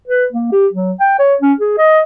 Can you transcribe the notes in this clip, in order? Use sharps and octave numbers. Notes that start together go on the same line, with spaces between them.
B4
A#3
G4
F#3
G5
C#5
C#4
G#4
D#5